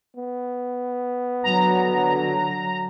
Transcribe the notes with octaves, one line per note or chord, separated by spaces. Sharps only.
B3
D3 F#3 A#5